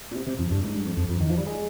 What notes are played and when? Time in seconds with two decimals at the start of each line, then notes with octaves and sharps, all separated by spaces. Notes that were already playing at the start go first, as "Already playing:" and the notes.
0.11 A#2
0.15 C3
0.27 C3
0.39 F2
0.51 G2
0.63 G#2
0.74 G2
0.85 F2
0.97 F2
1.09 F2
1.20 D#3
1.29 F3
1.37 G3
1.47 G#3